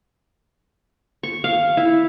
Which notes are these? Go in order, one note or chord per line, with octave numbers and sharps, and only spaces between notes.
C#6
F5
E4